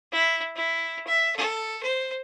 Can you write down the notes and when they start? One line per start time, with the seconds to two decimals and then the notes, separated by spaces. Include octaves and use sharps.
0.13 E4
0.56 E4
1.07 E5
1.36 A4
1.83 C5